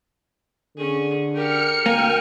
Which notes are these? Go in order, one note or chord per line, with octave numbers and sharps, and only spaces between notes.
D3 C#4 G#4
G4 A#4 F6 C#7
D2 A#3 G5 G#5 F6